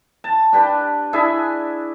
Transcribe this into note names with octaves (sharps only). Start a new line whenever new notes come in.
A5
D4 G4 B4
D4 E4 G#4 E5